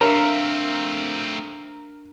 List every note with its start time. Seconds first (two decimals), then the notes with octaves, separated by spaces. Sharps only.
0.01 A3 C4 D4 A#4 E5 F5 A#5